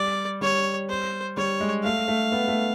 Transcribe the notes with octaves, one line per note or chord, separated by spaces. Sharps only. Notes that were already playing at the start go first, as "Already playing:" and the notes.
Already playing: G3 D5
G3 C#5
C5
G3 C#5
G#3
A3 F5
A3
B3
A3